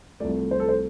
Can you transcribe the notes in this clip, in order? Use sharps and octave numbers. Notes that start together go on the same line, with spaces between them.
C2 C3 F3 A3 D5
C5
A4
C5